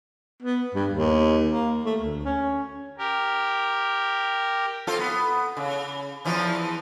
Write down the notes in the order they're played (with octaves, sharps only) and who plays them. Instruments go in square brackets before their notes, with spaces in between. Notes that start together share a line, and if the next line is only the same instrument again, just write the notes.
[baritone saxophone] B3
G2
D#2
A#3
A3
D2
C#4
[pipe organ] G4 A#4
[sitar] C4 F4 A4
B3
C#3
E2 E3 F3